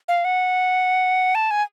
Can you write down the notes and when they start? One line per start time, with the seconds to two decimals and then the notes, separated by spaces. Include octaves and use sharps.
0.08 F5
0.25 F#5
1.35 A5
1.51 G#5